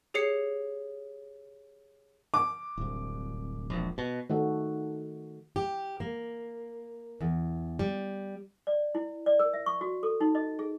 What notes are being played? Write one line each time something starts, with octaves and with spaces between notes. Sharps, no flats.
G4 G#4 C#5 C7 C#7
D6
D1 C2
E1 A#1
B2
D#3 A3 F#4 A4
G4
A#3
E2
G3
D5
E4
D5
A#4
E5
C#6
F#4
A4
D#4
D#5
G#4